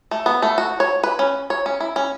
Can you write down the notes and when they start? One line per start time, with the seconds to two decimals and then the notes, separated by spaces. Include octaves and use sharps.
0.11 A3
0.26 B3
0.42 A3
0.58 F#4
0.80 C#5
1.03 B4
1.19 C#4
1.50 C#5
1.66 C#4
1.80 E4
1.96 C#4